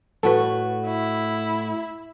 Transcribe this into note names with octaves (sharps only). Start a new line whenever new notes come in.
A2 F#4 A4 B4
E4